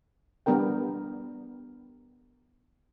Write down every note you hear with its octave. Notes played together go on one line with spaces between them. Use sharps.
G3 B3 D4 A#4 G5